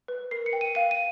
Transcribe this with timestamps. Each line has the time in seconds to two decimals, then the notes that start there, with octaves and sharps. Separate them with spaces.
0.08 B4
0.31 A#4 C7
0.46 C#7
0.53 G5
0.61 D#7
0.75 F5 D#7
0.91 D#7